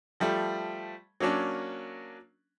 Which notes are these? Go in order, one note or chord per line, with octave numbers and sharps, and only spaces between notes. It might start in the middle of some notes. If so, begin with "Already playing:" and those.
F3 G3 A3
F#3 A#3 C#4 D4